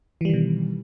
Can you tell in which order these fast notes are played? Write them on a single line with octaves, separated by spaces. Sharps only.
E3 G3 D#3 B2